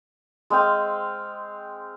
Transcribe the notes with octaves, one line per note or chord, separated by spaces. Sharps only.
G#3 C4 F5 G5